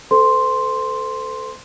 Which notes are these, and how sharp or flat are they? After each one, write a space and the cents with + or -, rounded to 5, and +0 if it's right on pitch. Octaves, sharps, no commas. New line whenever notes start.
A4 +0 C5 -40 C6 +0